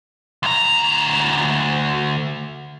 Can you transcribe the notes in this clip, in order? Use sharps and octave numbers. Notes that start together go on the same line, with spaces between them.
D2 A#5